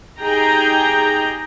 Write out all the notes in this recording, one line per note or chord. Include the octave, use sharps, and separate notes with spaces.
D#4 G4 G#4 G5 A#5